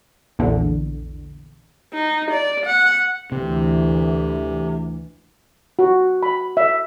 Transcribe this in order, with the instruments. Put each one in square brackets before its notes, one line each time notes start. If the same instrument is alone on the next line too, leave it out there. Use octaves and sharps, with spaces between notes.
[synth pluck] A#1 E2 D3
[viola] D#4
D5
F#5
[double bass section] D2 E3 [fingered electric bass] C3
[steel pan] F#4
B5
E5